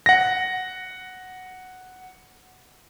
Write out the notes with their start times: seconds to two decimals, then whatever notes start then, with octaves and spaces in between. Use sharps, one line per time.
0.06 F#5 A#6